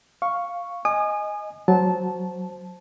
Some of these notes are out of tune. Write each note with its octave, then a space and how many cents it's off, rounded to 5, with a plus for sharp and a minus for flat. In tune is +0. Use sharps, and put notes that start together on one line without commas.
F5 +0 C#6 +0
D#5 +0 G#5 +0 D#6 -35
F#3 +0 C5 -5 A5 -15